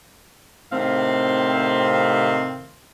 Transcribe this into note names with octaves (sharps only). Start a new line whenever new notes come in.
A2 C3 D#3 C4 F5